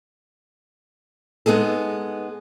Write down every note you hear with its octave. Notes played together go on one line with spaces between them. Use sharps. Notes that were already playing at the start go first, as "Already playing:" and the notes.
G#3 B3 D#4 G#4 A4